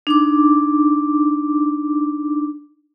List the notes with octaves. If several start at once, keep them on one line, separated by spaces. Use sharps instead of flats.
D4 D#4 D6